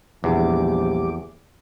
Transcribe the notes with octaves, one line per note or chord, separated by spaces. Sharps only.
A#1 E2 G3 G4 D6